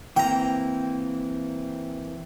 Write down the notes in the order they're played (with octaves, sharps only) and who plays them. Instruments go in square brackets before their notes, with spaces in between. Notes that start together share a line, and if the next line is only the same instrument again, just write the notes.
[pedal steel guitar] E3 A#3 C4 [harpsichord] G5 A#5